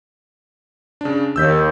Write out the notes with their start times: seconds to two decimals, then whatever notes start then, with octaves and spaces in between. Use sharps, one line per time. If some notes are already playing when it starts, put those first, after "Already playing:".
1.01 C#3 D4
1.36 D#2 E6 G6 B6